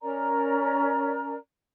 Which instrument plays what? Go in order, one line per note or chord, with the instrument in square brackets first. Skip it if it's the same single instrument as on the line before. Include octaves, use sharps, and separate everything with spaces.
[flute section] C#4 A#4 D5 A#5